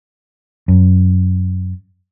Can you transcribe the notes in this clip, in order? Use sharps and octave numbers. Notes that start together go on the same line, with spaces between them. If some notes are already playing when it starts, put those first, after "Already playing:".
F#2